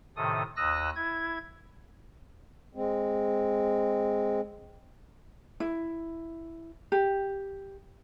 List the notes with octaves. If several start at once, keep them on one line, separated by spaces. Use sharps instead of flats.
A2 C3 D#3 A4 D#6
D#2 D#6 E6 F#6 A#6
E4 G#6
G#3 C4
E4
G4